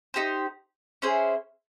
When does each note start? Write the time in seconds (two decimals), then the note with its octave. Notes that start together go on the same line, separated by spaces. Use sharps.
0.14 D#4 G4 C5
1.02 C#4 E4 G#4 C5